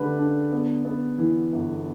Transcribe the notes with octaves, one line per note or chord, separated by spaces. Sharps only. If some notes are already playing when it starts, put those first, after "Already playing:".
Already playing: D3 A3 G4 B4
D4
B3
B3
E3
G1